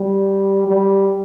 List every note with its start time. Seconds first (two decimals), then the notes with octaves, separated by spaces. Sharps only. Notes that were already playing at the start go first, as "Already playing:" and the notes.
Already playing: G3
0.68 G3